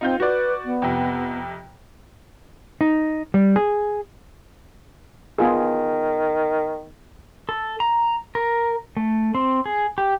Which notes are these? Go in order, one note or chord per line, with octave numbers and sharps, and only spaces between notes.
C4 D#4 F4 G6
F#4 B4 D5
B3
F2 C3
D#4
G3
G#4
D#3 B3 F4 G#4
A4
A#5
A#4
A3
C4
G#4
G4